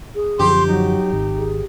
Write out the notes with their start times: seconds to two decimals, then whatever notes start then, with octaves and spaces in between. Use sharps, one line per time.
0.15 G#4
0.39 F#2 D3 F3 G4 C6
0.67 F#3 D#4
1.13 G#1
1.38 G#4